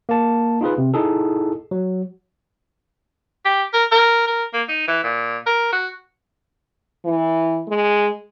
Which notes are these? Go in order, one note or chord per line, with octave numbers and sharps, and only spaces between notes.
A#3 A5
D#4 F4 G#4 B4
C3
D#4 E4 G#4 A4
F#3
G4
A#4
A#4
A#4
A#3
D#4
E3
A#2
A#4
F#4
E3
G#3